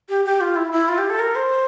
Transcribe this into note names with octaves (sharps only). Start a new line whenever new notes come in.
G4
G4
F4
E4
E4
F4
G4
A4
A#4
C5